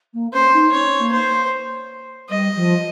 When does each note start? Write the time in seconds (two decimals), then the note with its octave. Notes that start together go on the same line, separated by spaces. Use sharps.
0.13 A#3
0.33 C#4 C5
0.53 D#4
0.72 C#4 C#5
0.98 A#3
1.12 C5
2.30 G3 D#5
2.55 F3